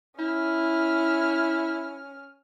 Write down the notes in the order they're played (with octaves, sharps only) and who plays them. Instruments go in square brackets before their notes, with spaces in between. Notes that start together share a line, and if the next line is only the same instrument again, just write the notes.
[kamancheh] C#4 F6 [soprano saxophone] E4